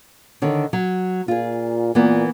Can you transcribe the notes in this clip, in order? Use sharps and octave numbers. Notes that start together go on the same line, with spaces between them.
D3 D#3 C#5
F#3
A#2 F4 G#4
A#2 E3 A#3 B3